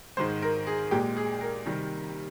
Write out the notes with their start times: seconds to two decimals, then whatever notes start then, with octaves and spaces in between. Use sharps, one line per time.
0.17 G#2 D#3 G#3 C5
0.42 A#4
0.67 G#4
0.91 A#2 G#3 G4
1.17 G#4
1.41 A#4
1.66 C3 D#3 G3